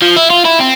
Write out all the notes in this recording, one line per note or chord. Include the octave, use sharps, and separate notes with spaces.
F3
E4
F4
E4
C4